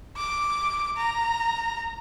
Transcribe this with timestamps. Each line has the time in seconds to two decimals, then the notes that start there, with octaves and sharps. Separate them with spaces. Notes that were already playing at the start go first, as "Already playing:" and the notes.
0.17 D6
0.97 A#5